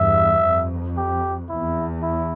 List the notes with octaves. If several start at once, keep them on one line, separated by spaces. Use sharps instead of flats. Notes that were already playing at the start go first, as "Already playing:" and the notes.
Already playing: E2 G2 E5
F2
G4
E2 E4
E4